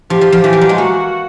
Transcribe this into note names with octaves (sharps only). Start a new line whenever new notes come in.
F3 G4
F3
F3
E3 G4
F3
F#3
G#3
A#3 F#4